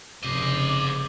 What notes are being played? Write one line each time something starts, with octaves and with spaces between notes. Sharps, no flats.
F1 C#3 C5 D#5 D6